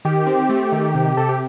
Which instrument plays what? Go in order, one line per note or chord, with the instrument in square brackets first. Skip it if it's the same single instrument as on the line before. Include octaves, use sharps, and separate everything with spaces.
[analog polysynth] D#3 G4
C4
A3
D#3
C3
C3 A4
G4